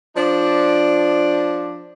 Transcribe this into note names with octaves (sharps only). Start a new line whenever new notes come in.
F3 D4